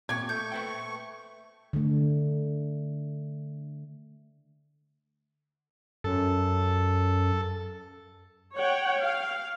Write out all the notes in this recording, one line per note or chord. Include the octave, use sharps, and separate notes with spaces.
A#2 G4 C#6 G#6
A3 C#6 G6
B4 C5 G5
D3 A3
F#2 A4
C#5 F#5 G5
F5